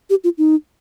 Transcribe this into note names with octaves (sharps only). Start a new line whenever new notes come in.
G4
F4
D#4